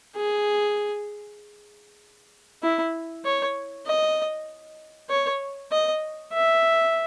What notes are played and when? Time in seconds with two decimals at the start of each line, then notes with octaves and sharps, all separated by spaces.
0.16 G#4
2.63 E4
3.25 C#5
3.86 D#5
5.10 C#5
5.71 D#5
6.33 E5